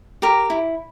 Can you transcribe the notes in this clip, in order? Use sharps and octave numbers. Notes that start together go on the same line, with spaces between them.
G4 A#4 A#5
E4